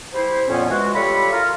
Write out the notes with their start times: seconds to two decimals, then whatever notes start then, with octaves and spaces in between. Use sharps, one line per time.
0.14 G3 E4 C5
0.48 F2 A#2 B3 C#4
0.71 E3 G#3 F#4
0.95 G3 F4 A4 C#5 D5 B5
1.32 F4 A#4